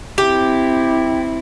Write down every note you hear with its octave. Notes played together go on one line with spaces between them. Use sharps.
C4 E4 G4